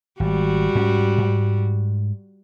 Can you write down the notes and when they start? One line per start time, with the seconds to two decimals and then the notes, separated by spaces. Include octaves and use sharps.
0.20 G#1 G3 F#4
0.75 G#2 C#4
1.18 G#2